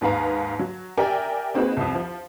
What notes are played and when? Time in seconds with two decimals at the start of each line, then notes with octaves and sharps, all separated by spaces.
0.01 D#2 G#2 B4 F5 A#5
0.59 F#3
0.97 G4 A#4 D5 E5 G5 G#5
1.54 A#3 C4 D#4 F#4 G#4 B4
1.77 C2 F2
1.95 F3